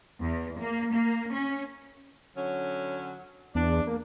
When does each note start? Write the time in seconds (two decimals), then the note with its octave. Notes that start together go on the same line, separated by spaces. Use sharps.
0.21 E2
0.58 A#3
0.94 A#3
1.33 C#4
2.35 D3 F#3 C#4
3.55 E2 D4
3.87 A#3